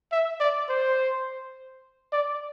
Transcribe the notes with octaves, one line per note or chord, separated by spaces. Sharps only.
E5
D5
C5
D5